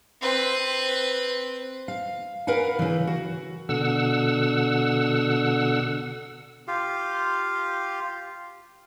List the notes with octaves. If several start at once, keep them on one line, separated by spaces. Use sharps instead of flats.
C4 B4
F5
A#4 B4 F5 F#5 G#5
C#3 E3
F#4
B2 D3 F#5 E6
F4 G4 F5